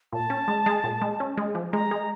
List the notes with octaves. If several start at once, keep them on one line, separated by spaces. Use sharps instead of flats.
A#2 A5
C#4
G#3
G#3
A#2
G#3
C#4
G#3
F3
G#3 A#5
G#3